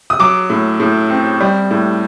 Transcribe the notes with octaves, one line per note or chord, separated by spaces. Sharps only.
D#6
F#3 D6
A2
A2
C4
G3
A2